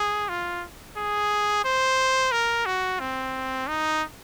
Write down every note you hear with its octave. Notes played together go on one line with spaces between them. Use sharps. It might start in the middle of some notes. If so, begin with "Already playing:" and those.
Already playing: G#4
F4
G#4
C5
A#4
F#4
C4
D#4